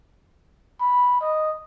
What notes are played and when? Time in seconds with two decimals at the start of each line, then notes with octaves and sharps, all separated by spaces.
0.80 B5
1.21 D#5